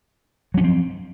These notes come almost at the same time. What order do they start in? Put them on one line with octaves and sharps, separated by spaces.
F#3 C#4 F3 C4